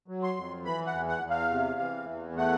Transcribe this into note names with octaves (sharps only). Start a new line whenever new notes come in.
F#3
C6
F2
E3 B5
F#5
E2
F#5
E2
F5
C3
E3
E2
A3 F#5